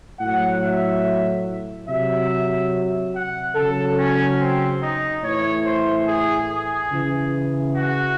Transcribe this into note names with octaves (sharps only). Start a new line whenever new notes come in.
A2 F#3 F#5
E5
C3 F#3 E5
F#5
C#3 F#3 A4
C#4
C4
D#4
A2 E3 C#5
C5
G#4
G#4
C#3 E3
F#4